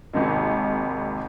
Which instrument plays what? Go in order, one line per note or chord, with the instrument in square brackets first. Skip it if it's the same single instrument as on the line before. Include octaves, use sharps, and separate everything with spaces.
[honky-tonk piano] G#1 D#2 G#2 C3 D#3